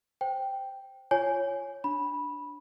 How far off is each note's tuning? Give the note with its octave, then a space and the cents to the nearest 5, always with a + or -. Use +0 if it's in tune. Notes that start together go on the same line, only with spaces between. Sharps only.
C5 +0 G5 +0
F4 -15 C#5 +0 G#5 +0
D4 +0 B5 -15